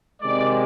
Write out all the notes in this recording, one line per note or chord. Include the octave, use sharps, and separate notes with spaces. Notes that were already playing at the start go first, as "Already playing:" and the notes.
C3 D#3 G#3 D5